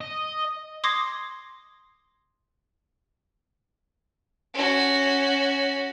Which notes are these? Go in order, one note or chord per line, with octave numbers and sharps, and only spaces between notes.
D#5
C6 D6 D#6 G#6 A#6 C7
C#4 F#4